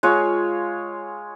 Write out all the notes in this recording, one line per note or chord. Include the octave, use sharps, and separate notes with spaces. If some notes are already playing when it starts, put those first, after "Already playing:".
G#3 F4 C#5